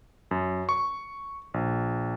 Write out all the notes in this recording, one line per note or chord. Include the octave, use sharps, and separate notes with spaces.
F#2
C#6
A#1